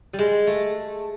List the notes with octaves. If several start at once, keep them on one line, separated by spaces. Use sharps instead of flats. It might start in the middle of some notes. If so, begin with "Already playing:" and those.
G3
G#3
A3